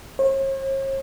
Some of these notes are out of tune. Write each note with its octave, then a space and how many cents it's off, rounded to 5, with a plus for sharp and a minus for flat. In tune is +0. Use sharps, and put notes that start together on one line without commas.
C#5 -45